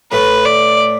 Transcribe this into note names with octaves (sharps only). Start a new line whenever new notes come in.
A2 A3 B4
D5